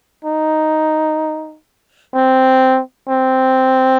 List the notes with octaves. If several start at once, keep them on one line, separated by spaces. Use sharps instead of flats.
D#4
C4
C4